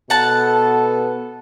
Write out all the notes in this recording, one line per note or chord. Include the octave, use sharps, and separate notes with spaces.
B2 B3 A4 F#5 A5